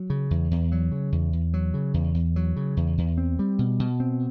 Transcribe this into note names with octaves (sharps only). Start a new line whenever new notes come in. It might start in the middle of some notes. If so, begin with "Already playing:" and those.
Already playing: F#3
C#3
E2
E2
F#3
C#3
E2
E2
F#3
C#3
E2
E2
F#3
C#3
E2
E2
C4
G3
B2
B2
C4